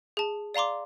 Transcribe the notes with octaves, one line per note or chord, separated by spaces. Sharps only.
G#4 A5
D5 F5 A#5 C6 D6